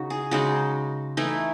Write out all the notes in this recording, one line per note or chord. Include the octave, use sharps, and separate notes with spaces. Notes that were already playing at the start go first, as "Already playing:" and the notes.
Already playing: C#3 D#4 F#4
G#4
C#3 G#3 D#4 F#4
E3 A3 D#4 E4